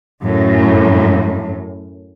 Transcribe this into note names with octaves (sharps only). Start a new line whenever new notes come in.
F#2 A2